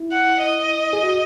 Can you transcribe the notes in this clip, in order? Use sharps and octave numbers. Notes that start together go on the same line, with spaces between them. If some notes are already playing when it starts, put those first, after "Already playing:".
Already playing: E4
F#5
D#5
G#4
F#4